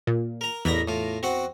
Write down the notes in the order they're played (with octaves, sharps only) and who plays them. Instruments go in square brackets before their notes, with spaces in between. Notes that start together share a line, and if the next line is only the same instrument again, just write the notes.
[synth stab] A#2
[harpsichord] A#4 A#5
[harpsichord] A1 A#4 B5 [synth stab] E2 A#6
[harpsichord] A2 F4
C4 F#4 F#5